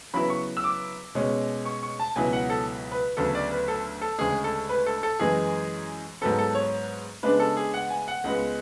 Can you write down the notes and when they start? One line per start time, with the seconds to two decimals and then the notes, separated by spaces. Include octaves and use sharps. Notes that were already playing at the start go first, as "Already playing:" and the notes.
0.13 C#3 F#3 B3 E4 B5
0.30 C#6
0.57 E6
0.64 D6
1.15 B2 G#3 C#4
1.65 C#6
1.83 C#6
2.00 A5
2.16 C#2 B2 F#3 B3 E4 G#5
2.33 F#5
2.50 A4
2.92 B4
3.17 D2 C#3 F#3 B3 A4
3.35 D5
3.52 B4
3.68 A4
4.01 A4
4.18 D2 C#3 G#3 G#4
4.44 A4
4.69 B4
4.86 A4
5.03 A4
5.19 F#2 E3 G#3 G#4
6.21 G#2 F#3 B3 A4
6.39 A4
6.55 C#5
7.23 C#3 G#3 B3 D4 B4
7.40 A4
7.57 G#4
7.74 F#5
7.90 G#5
8.08 F#5
8.24 C#2 C#3 G#3 B3